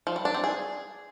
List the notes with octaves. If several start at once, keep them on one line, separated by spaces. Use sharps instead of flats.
F3
G3
D4
C4
G#4